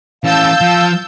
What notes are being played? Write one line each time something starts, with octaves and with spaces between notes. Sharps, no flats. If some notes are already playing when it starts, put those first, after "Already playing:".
E3 C#4 F5 A5 E6 G6
F3